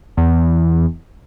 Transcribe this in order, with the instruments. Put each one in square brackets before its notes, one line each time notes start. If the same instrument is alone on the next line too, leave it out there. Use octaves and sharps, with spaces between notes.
[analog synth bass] E2